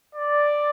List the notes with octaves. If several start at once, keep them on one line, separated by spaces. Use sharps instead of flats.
D5